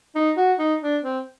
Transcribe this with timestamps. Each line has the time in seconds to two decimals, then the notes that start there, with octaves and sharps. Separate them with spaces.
0.15 D#4
0.37 F#4
0.59 D#4
0.82 D4
1.03 C4